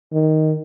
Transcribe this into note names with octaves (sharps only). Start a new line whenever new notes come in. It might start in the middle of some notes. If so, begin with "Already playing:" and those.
D#3